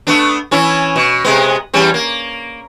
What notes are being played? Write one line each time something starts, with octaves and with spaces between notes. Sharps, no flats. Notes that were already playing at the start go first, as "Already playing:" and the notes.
A3 B3 D4
E3 C#4 E4
B2
C3 G#3 B3
E2 G3 C#4
A#3